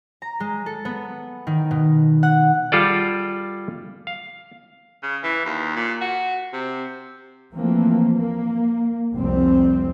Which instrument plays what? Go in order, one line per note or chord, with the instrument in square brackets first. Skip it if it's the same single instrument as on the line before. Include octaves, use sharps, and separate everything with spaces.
[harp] A#5
G#3
A4
B3
D#3
B2
F#5
[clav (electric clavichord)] G3 F4 G#4 A4 D5
F5
[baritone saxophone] C#3
E3
D#2
A#2
F#4
C3
[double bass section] E3 F3 A3 A#3 C4
A#3
F1 C2 G3 C4